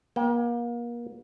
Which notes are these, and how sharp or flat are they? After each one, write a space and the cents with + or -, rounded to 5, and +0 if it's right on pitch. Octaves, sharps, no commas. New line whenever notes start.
A#3 +35 G5 +0